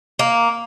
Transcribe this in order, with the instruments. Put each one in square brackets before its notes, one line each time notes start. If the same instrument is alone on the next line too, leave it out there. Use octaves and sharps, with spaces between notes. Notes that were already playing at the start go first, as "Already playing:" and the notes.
[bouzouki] A#3